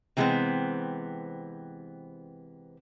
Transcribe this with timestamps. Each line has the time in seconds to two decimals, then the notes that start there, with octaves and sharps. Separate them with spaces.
0.17 C3 E3 G3 G#3 B3 C4